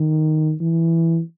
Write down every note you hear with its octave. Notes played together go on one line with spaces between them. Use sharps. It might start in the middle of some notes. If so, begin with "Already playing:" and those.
Already playing: D#3
E3